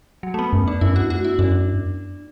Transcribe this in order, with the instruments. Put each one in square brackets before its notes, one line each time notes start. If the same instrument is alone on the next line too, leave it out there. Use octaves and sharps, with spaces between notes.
[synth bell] F#3
A3
B3
[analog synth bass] F#2
[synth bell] D4
[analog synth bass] F#2 [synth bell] E4
[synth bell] F#4
F#4
E4
[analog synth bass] F#2 [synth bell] D4